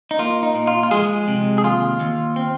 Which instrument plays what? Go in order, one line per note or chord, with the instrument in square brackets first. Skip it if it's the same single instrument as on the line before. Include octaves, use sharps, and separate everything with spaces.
[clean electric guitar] D#4
A#3 F4
D#4
A#2
F4
F4
F3 G#3 G#4
C3
G#4
D#2 F4
D#2
C4